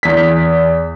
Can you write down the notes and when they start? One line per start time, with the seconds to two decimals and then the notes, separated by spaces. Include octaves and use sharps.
0.03 E2 B6